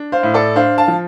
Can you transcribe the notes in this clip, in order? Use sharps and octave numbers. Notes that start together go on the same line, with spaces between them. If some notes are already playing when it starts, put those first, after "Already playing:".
Already playing: D4
C5 F5
A2
A4 D5
D4 C5 F5
F5 A5
F3